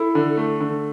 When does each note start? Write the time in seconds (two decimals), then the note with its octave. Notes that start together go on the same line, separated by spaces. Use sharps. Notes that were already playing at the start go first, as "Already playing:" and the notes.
Already playing: E4 A4
0.15 D3
0.37 A3
0.61 D3